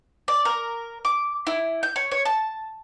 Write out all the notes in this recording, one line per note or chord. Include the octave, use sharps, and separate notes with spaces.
D5
A#4
D6
E4
G6
C#5
C#5
A5